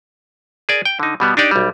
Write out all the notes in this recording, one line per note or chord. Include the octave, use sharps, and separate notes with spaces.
G#4 A#4 D5 G#5
G5
D3 D#4
B2 G3 B3
D4 D#4 G4 D5
B1 G3